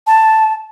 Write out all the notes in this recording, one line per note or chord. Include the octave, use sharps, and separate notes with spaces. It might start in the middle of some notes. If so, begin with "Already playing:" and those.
A5